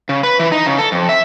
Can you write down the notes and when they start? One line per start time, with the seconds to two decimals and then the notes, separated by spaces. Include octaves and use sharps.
0.09 C#3
0.23 B4
0.40 E3
0.52 D#4
0.66 C#3
0.78 A4
0.92 F2
1.09 E5